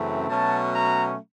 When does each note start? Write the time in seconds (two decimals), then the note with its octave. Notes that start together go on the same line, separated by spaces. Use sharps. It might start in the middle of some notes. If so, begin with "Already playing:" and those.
Already playing: F#2 C#3 E3 A3 C4
0.29 B2 F#3 A3 C#4 A5
0.72 A#5